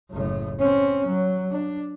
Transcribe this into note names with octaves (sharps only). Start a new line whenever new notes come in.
F#1 A2
C4 C#4
F#3
D4